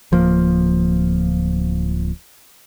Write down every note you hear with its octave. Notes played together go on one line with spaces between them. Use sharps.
D1 F3 A#3